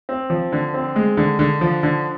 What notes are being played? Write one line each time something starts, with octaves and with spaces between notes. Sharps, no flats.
C4
F3
D3
C4
G#3
D3
D3
F3
D3